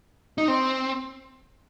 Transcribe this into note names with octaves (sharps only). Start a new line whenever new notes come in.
D#4
C4